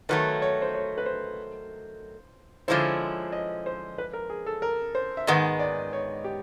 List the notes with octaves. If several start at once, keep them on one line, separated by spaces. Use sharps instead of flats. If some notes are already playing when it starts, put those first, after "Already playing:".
D#3 F#3 A3 B4
C#5
C5
C#5
B4
C5
D3 F3 G#3 C#4 E4 C5
D#5
C5
B4
A#4
G#4
A4
A#4
C5
E5
G#2 D#3 G#3 B3 D#5
D5
C#5
G4